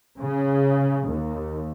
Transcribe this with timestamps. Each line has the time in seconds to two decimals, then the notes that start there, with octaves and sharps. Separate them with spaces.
0.18 C#3
1.06 D#2